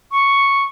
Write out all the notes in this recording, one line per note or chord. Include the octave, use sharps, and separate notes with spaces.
C#6